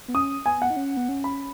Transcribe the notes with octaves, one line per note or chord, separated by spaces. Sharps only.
B3
C#4 D#6
B3 G#5
F#5
D#4
C#4
B3
C#4
B5